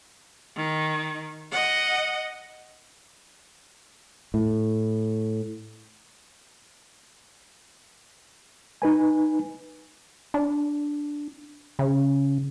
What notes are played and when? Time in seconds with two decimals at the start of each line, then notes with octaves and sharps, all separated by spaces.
0.56 D#3
1.52 D#5 F#5
4.34 A2
8.82 D#4 B4 G#5
10.34 D4
11.79 C#3